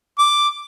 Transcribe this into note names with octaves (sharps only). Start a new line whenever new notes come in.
D6